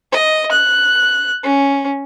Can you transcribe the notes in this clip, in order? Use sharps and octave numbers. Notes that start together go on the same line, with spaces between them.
D#5
F#6
C#4